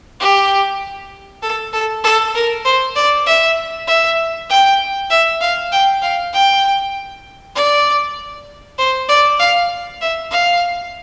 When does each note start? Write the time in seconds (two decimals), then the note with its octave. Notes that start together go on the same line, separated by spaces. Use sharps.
0.20 G4
1.42 A4
1.73 A4
2.04 A4
2.35 A#4
2.65 C5
2.96 D5
3.26 E5
3.87 E5
4.50 G5
5.10 E5
5.41 F5
5.72 G5
6.02 F5
6.33 G5
7.55 D5
8.78 C5
9.09 D5
9.39 F5
10.01 E5
10.31 F5